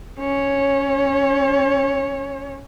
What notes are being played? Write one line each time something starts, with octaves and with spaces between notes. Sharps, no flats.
C#4 C#5